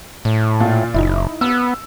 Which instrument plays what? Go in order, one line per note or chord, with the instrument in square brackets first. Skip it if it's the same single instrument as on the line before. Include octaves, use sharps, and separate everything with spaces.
[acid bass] A2
[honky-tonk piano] A#2 F4
[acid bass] F#1 [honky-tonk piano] D#4 E4
[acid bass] B3 [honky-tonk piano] E6